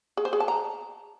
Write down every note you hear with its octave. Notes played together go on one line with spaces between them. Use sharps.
G#4
C5
G#4
A5
A#5